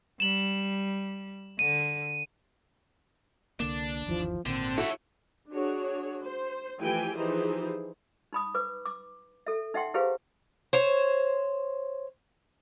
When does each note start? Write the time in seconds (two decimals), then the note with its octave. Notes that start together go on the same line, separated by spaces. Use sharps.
0.20 G3 E7 F#7
1.59 D3 D#7
3.60 C2 D3 A#3 D4
4.06 G1 D#2 E3 F3
4.46 G#1 A#2 D3 C4
4.78 E4 F#4 A4 C#5 E5
5.50 D4 F#4 G#4 C#5
6.23 C5
6.80 E3 F3 A3 G4 G5 G#5
7.17 E3 F3 D#4 G4 G#4 C5
8.33 D#4 B5 D#6
8.55 B4 D6
8.85 D6
9.47 A4 E5
9.74 D#4 E5 F#5 G5 C6
9.94 E4 G4 G#4 B4 C5 F5
10.73 C5 C#5